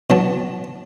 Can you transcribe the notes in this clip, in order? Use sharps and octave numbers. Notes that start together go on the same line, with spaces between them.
B2 F#3 A5